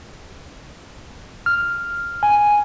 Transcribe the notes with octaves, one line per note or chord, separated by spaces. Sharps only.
F6
G#5